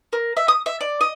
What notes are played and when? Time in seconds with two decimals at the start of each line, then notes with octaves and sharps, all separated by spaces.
0.13 A#4
0.37 E5
0.48 D#6
0.66 E5
0.81 D5
1.01 D#5